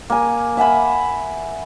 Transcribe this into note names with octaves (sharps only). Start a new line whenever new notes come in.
A#3 G#5
E5 F#5 G#5 B5